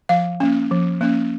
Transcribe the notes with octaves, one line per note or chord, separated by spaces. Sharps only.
F3 F5
A#3 C#4
F3
A#3 C#4